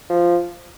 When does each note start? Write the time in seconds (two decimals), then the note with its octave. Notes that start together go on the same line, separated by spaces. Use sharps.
0.10 F3